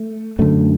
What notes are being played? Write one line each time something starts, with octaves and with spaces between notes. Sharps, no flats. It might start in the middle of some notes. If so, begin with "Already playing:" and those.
Already playing: A3
F#2 D3 A3